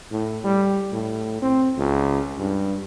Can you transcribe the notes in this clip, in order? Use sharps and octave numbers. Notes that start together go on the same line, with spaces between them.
A2
G3
A2
C4
C#2
G2